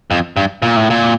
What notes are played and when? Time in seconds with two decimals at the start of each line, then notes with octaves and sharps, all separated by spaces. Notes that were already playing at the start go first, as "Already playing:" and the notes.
0.11 F2
0.36 G2
0.62 A#2
0.76 A2
0.90 A#2